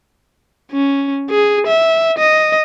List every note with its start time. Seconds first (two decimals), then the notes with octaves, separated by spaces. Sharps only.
0.72 C#4
1.31 G#4
1.67 E5
2.18 D#5